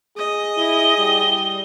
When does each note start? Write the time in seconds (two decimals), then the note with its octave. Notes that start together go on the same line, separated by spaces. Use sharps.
0.17 G#4 D#5
0.57 E4 G7
0.98 G3